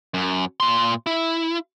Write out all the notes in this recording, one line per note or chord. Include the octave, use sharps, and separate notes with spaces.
F#2
A#2 C6
E4